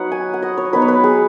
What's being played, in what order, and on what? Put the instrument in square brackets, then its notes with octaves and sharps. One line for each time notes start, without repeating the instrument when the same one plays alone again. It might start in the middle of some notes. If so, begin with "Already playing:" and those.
Already playing: [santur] F#3 D#4 B4 C#5 F#5
G#5
F#5
D#5
C#5
F#3 B3 D#4 B4
C#5
B4
G#4